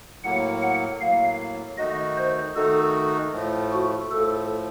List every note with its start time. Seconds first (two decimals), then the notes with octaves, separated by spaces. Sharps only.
0.24 A2 F#3 A#3 F#5
0.62 F#5
1.01 A2 F#3 A#3 F5
1.78 D#3 A3 D#4 F#4 D#5
2.17 C5
2.56 D#3 A3 D#4 F#4 A4
3.33 A2 F3 A3
3.73 F#4
4.11 A2 F3 A3 A4